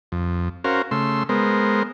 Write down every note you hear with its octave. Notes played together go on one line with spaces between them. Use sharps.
F2
C#4 F#4 A#4 C5 F5
C#3 A3 C6 E6
G#3 B3 A#4 C5